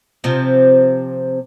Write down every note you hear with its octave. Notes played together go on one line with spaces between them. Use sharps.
C3 F3